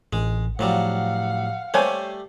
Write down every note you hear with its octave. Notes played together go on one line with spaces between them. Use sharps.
A1 G#3
F2 A2 F#3 G3 F5 F#5
G3 A3 G4 C5 C#5 G#5